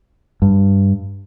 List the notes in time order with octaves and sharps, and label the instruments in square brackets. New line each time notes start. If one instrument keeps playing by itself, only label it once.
[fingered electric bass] G2